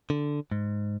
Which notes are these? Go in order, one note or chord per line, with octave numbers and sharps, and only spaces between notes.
D3
G#2